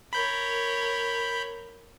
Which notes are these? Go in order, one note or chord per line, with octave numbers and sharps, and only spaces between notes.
A#4 C#5 B5 G6